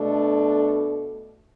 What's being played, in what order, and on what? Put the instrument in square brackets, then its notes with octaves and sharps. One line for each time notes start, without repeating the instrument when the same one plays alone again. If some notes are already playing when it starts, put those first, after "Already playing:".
Already playing: [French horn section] B2 A3 D4 A4